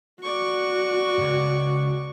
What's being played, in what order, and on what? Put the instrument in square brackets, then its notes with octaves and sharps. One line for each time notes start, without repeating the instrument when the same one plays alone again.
[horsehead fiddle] F#4 [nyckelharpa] D5 C#6
[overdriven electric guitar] C#2 G#2